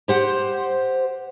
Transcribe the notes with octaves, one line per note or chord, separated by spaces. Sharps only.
G4 C5 F#5